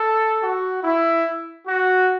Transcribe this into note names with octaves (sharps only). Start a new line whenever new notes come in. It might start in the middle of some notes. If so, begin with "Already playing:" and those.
Already playing: A4
F#4
E4
F#4